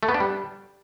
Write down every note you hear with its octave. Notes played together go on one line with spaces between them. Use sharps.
A3
B3
D4
G3